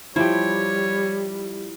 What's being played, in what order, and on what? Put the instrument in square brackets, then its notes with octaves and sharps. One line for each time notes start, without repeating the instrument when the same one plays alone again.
[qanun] F3 [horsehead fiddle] G3 [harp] E4 G4 [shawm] C#5